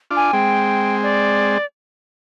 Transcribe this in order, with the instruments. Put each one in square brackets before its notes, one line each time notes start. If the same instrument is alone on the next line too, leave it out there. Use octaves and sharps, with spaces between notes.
[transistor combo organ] D4 F4
[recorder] G#5
[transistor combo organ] G#3 C4 [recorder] G5
[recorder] D5